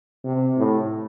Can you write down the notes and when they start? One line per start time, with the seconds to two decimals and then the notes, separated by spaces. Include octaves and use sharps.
0.24 C3
0.57 A2